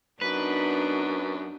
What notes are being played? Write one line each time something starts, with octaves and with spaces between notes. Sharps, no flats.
F#2 B3 D4 D#4 B4